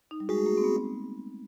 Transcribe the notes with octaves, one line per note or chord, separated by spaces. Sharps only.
D#4
G3
G#3 F#4 G#4
A3
A#3
C4
B3